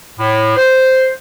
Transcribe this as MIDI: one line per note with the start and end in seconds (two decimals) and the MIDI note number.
0.19 0.53 45
0.56 1.09 72